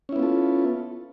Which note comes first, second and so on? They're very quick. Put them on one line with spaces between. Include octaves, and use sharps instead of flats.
C#4 E4 B3 F4 A4